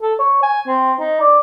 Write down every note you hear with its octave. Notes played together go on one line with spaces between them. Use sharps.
A4
C#5
G#5
C4
D#4
D5